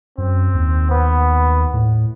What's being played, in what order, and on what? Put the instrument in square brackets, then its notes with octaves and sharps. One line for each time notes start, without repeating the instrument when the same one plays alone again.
[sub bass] F#2 [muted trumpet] C4
[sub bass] D#2
[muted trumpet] B3
[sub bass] A2